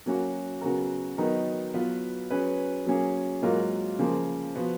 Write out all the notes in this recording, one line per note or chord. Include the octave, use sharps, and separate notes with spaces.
F#3 A#3 C#4 F#4
C#3 F#3 B3 F#4 A#4
D#3 F#3 B3 D#4 A#4
F#3 B3 F4 B4
F#3 C#4 G#4 B4
F#3 A#3 C#4 G#4
G#2 F#3 A#3 F4 A#4
C#3 F3 A#3
F3 B3 F#4